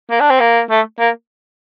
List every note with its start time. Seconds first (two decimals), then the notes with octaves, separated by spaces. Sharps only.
0.10 A#3
0.20 D4
0.30 C4
0.40 A#3
0.70 A3
0.99 A#3